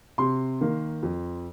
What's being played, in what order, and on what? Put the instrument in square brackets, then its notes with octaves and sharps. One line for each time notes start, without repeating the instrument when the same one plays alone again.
[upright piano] C3 C6
D#3 A#3
F2